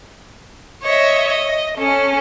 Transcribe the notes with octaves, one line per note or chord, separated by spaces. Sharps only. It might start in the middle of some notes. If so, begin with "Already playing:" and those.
C#5 D#5 E5
D#5
C#4 A4